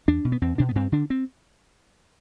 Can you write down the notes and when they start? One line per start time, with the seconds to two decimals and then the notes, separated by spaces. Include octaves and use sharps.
0.08 E2 D4
0.25 B2
0.32 B3
0.42 E2 C4
0.58 B2 D4
0.69 B3
0.75 G2 C4
0.92 D3 D4
1.10 C4